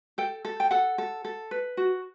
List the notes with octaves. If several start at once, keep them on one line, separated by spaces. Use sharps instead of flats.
A4 G5
A4
G5
A4 F#5
A4
A4
B4
F#4